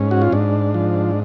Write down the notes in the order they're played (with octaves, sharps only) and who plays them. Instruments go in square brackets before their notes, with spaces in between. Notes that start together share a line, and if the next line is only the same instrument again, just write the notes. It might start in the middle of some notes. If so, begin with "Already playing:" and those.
Already playing: [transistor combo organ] G#2 C#4
F#4
F4
G#2 D4
F3